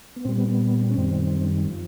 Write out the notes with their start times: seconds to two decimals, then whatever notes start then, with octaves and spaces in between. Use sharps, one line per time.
0.16 B3
0.25 A#2 G3 C4
0.38 B3
0.49 B3
0.90 C#4
0.96 F#2 D#3 G3 C4
1.69 F3